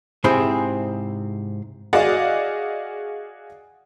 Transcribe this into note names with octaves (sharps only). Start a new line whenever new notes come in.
G#2 C3 C4 E4 G#4 C5
F#4 G#4 D5 D#5 F5 F#5